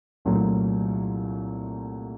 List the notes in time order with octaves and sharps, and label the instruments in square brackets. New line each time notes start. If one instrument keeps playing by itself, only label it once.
[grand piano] C2 A#2 F#3 A3